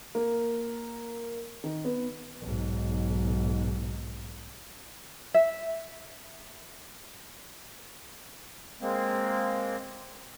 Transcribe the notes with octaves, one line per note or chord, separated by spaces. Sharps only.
A#3
D#3
B3
B1 G#2
E5
G#3 A#3 C4